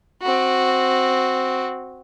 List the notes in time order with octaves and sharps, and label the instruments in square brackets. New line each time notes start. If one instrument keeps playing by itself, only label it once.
[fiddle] C4 F#4